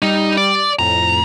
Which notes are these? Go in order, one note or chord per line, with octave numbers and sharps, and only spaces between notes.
G3 D#4
D5
F2 A2 A#5